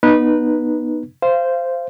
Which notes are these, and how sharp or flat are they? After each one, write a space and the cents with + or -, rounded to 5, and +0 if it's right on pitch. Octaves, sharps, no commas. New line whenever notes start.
B3 -20 D#4 -20 B4 -15
C5 -5 F5 -25